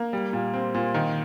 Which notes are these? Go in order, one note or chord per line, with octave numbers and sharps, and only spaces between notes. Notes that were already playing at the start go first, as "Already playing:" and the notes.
Already playing: A#3
G3
A#2
C4
A#2
D#3